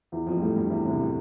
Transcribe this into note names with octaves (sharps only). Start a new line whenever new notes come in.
E2 E3
F2 F3
G3
A2 A3
G2 G3
E2 E3
C2 C3
A2